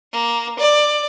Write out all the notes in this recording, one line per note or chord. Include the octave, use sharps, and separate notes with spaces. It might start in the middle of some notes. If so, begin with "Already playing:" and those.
A#3
D5